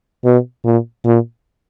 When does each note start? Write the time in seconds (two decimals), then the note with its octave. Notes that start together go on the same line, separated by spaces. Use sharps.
0.25 B2
0.65 A#2
1.05 A#2